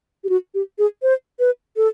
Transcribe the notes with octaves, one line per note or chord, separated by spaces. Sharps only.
G4
F#4
G4
G#4
C5
B4
A4